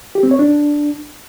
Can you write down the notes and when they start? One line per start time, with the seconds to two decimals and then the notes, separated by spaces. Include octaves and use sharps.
0.15 G4
0.23 C4
0.31 C#5
0.39 D4